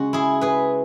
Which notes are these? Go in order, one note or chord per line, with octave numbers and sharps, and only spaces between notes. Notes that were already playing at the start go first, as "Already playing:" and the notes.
Already playing: C#3 G#3 C#4 F#4
E4 G#4
G#4 B4